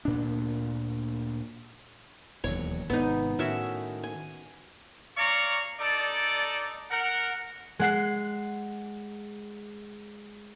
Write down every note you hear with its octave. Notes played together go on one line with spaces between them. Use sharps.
D2 A#2 D4
E1 D#2 F#3 C#5
G#1 C3 B3 D#4
A2 D#3 C#4 F#4 E5
G#5
C#5 D5 F5 A#5 C#6
D#4 A4 D5
A#4 F#5
G#3 F#5 C7